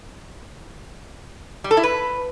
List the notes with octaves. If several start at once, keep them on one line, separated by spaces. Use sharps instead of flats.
G3
A4
E4
B4